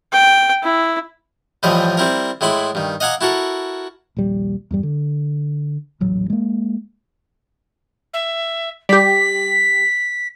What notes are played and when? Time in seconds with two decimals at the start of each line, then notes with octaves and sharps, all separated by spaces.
0.13 G5
0.63 E4
1.63 A2 E3 F3 G3 D#5
1.97 G3 C4 E4 A#4
2.41 A2 G#3 E4 B5 C6
2.75 G2 D#3
3.00 D#5 F5 F#5 G#5 A#5 D6
3.21 E4 F#4 A4 A#4
4.17 D#1 A#1 G3
4.71 E2 G2 G3
4.83 D3
6.00 D#1 A1 F#3
6.30 G#3 A#3
8.13 E5
8.89 G3 G4 B6